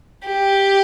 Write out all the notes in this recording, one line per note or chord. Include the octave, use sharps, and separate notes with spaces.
G4